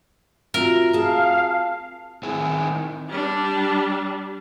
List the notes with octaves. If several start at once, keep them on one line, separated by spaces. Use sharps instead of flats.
C4 F4 F#4 A#4 E5
G#4 F5 A5
D#3 C4 E4 G#4
G3 D4